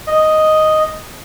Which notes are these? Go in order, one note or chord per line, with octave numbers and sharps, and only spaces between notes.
D#5